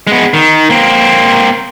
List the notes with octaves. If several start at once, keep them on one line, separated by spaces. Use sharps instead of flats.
G#3 B3
D#3
A#3 C4